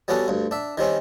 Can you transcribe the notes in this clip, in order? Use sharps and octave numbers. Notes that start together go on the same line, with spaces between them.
G3 B3 C#4 F#4 A4
D2 G2
D4 E5
D#3 G3 C4 C#4